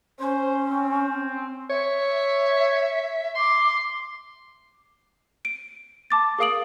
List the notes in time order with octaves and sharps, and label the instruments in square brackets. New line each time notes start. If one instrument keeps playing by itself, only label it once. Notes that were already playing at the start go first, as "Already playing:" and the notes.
[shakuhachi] C#4 [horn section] C5
[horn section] C4
[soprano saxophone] C#5 [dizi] E5
[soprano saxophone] C6 [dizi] D6
[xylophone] D7 D#7
A5 D6 A6
G#4 A#4 F5 D#6 D7 F#7